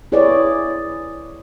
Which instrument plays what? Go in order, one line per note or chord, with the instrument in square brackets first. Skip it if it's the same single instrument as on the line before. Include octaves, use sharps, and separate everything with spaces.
[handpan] E4 G#4 B4 C#5 D5